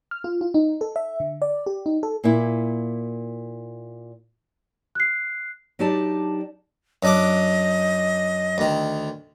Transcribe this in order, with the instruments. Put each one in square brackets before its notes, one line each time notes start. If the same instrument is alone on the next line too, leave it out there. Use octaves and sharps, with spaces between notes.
[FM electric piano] F6
F4
F4
D#4
A4
E5
D3
D5
G4
D#4
A4
[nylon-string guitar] A#2 A#3 E4
[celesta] F#6 C7
[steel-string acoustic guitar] F#3 D4 D#4 G4 D5 A5
[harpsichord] F#2 D4 D6 [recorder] D#5
[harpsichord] D2 D#3